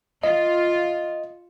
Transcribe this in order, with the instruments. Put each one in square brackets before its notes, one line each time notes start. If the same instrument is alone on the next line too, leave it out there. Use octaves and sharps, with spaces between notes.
[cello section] F4 [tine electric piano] D#5